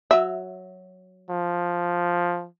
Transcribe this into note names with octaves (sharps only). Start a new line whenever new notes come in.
F#3 E5
F3